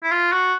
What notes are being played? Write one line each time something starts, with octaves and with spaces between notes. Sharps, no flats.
E4
F4
F#4